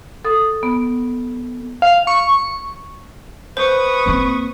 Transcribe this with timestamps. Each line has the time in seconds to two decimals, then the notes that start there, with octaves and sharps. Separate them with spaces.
0.25 A4 D#6
0.63 B3
1.82 F5
2.07 C#6
3.57 B4 C5 C#6 D#6
4.06 A#3 C4